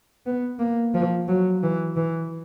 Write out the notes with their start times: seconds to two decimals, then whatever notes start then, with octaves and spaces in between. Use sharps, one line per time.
0.26 B3
0.59 A#3
0.94 F3
1.28 F#3
1.63 E3
1.96 E3